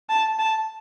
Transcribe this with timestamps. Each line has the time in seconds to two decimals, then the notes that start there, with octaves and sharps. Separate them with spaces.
0.09 A5
0.39 A5